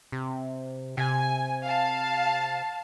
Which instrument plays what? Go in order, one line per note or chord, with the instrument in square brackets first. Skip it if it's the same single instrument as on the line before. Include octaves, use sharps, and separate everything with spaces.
[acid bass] C3
[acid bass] C3 [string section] G#5
[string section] F5 A5